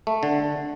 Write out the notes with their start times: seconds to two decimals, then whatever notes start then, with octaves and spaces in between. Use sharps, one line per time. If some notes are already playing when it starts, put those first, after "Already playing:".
0.07 A3
0.23 D3